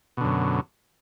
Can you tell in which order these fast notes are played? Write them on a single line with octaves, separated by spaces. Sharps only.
B2 D3 F#2